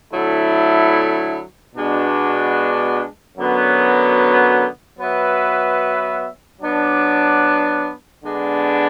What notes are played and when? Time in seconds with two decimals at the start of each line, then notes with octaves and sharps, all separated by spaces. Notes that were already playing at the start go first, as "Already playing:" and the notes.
0.12 D3 F#3 A3 E4
1.75 B2 G#3 B3 D4 F#4
3.36 F#2 D3 F#3 B3 F#4
4.98 F#3 B3 F#4 B4 E5
6.60 F#3 B3 D4
8.22 D3 G#3 B3 D4